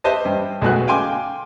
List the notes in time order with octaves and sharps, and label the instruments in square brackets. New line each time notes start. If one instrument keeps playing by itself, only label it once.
[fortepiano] G4 B4 C5 D#5 E5 A5
G2
B1 G#3 A3 F#4 B4 F#6
F5 G5 G#5 C6 D6